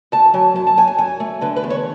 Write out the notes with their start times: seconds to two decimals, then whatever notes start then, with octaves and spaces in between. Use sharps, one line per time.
0.12 D2 A5
0.34 F#3 G#5
0.56 F#2 A5
0.67 A5
0.77 F#2 G#5
0.87 G#5
0.98 F#2 G#5
1.20 A3
1.41 D3 B4
1.56 B4
1.64 E2
1.70 C#5